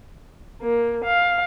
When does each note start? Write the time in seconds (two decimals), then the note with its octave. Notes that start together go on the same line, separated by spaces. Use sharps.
0.61 A#3
1.05 F5